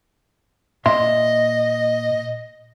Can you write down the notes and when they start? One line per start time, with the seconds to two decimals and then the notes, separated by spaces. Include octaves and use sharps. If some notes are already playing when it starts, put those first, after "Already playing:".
0.86 A#2 D#5 E5 C6